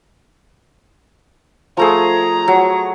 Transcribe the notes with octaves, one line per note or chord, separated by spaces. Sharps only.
F3 A3 G#4 A#5
F#3